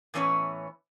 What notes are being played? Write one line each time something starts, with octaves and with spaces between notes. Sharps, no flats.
A2 E3 B3 C#4 C#5